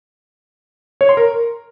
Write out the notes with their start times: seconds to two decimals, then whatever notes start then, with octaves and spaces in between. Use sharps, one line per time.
1.01 C#5
1.09 C6
1.17 A#4